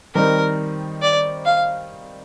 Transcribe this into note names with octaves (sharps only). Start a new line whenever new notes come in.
D#3 G3 C4 D#4 A#4
D5
F5